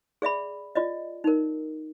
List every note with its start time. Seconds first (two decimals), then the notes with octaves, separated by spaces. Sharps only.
0.22 G#4 D5 E5 B5
0.75 F4 D5 D#5
1.24 D#4 A#4